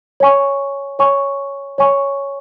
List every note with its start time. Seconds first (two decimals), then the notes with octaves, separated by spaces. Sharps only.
0.20 C#5 G#5 C#6
0.99 C#5 G#5 C#6
1.78 C#5 G#5 C#6